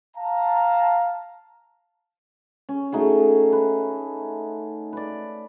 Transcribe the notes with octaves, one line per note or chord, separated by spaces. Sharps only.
F5 A5 A#5
C#4
A3 D#4 F#4 G#4
B4
B4 D5